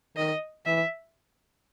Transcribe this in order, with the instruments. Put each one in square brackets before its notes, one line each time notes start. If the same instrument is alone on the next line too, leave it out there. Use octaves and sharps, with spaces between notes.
[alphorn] D#3 [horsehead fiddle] D#5
[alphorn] E3 [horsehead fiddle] E5